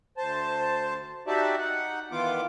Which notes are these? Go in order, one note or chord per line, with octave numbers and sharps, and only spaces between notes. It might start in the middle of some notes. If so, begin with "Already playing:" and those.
D2 C5 A5
D#4 F#4 G4 D5 E5 A5
D#4 F#5
D#3 E3 B3 F4 D6